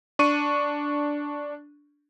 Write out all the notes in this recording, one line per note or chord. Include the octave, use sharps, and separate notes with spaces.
D4 C#6 D#7